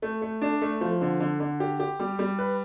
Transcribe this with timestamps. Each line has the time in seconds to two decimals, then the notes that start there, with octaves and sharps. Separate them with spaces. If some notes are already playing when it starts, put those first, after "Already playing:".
0.02 A3
0.22 A3
0.42 D4
0.62 A3
0.81 F3
1.01 D3
1.20 D3
1.40 D3
1.60 G4
1.80 G4
1.99 G3
2.19 G3
2.39 B4